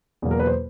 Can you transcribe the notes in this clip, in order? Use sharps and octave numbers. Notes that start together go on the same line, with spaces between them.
E2 B2 F#3 A#3
A#4
B4
C5